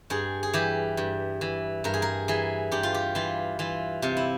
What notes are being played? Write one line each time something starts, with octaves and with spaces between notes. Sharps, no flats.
G2 G#4
G#4
E3 G4
G2
E3
G2 A#4
G#4
A#4
E3 G#4
G2 G4
F4
G4
E3 F4
E3 F4
C3 F4
E4